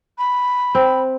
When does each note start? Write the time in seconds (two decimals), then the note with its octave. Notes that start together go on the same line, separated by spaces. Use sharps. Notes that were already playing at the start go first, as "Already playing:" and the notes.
0.18 B5
0.75 C4